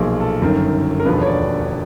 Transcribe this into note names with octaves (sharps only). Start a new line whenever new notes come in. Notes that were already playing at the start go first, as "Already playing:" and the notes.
Already playing: B1 A#2 F3 G#4
A4
G1 F#2 D#3
A#4
E1 D#2 D3 F3 B4
C#5
D5